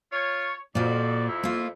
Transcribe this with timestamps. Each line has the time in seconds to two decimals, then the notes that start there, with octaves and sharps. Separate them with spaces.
0.12 F4 C#5
0.75 F2 A#2 F#4 D5
1.29 E4
1.43 A#3 F4